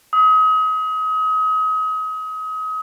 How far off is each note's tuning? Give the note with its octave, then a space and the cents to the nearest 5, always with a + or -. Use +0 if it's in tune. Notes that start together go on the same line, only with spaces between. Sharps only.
D#6 +35